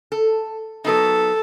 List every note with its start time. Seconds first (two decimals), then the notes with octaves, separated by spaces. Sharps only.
0.12 A4
0.85 F#3 B3 D#4 A4